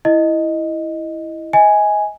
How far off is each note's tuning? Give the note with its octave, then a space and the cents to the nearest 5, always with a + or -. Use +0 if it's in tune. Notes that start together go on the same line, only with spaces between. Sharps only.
E4 +0 D#5 +0
D#5 +35 G#5 +0